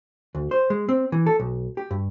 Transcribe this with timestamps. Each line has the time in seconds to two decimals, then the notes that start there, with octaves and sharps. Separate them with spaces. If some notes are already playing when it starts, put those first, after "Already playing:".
0.35 D2
0.51 C5
0.70 G#3
0.89 C4
1.12 E3
1.26 A4
1.40 B1
1.77 G4
1.91 G2